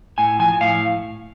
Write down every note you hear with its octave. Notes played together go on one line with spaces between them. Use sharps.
A2 G#5
F3 G#5
A2 F5